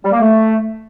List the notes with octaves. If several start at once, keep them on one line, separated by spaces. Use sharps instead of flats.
G3
A#3
A3